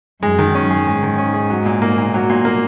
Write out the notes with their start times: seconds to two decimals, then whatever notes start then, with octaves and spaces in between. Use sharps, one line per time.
0.22 F#2 G#3
0.38 D#3
0.55 C#4
0.70 G#4
0.87 G#2 G#3
1.03 D#3
1.18 C#4
1.34 G#4
1.50 F#3
1.66 A#2
1.82 A#3
1.98 A#2
2.14 F#3
2.30 A#2
2.45 A#3